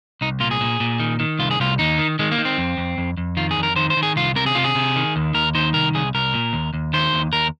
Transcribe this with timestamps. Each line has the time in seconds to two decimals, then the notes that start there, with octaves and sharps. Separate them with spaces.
0.21 C2 D#4
0.40 A#2 F4
0.51 G#4
0.61 A#2
0.80 A#2
1.00 D#3
1.20 D#3
1.39 C2 F4
1.51 G#4
1.60 C2 F4
1.79 D#2 D#4
1.99 D#3
2.19 D#3 G#3
2.32 A#3
2.38 D#3
2.45 C4
2.58 F2
2.77 F2
2.98 F2
3.17 F2
3.37 D#3 F4
3.51 G#4
3.57 F2
3.63 A#4
3.76 D#3 C5
3.90 C5
3.97 D#3
4.03 G#4
4.16 C2 F4
4.36 C3 A#4
4.46 G#4
4.55 C3 F4
4.64 G#4
4.75 C3
4.96 D#3
5.16 D#2
5.34 D#2 A#4
5.55 D#3 C5
5.74 C2 A#4
5.95 C2 G#4
6.14 C2 A#4
6.34 A#2
6.53 D#2
6.74 D#2
6.94 D#3 C5
7.13 D#2
7.33 D#2 A#4